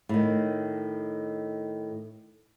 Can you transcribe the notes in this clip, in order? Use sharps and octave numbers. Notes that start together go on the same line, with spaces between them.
A2 D#3